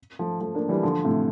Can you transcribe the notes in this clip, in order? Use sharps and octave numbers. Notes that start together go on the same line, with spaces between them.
F3 A3
F3 A3
A#3 D4
E3 G3
D3 F3
A2 C3